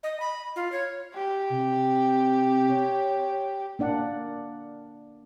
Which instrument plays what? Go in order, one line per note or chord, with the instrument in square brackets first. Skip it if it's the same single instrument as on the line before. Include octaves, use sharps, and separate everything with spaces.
[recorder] D#5
B5
F4
C#5
[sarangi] G4
[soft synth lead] C3
C#5
[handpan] A#3 D4 D5 F#5